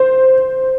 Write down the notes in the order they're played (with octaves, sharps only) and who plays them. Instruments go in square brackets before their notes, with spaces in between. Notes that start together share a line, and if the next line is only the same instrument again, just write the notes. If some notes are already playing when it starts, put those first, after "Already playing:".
Already playing: [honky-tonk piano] C5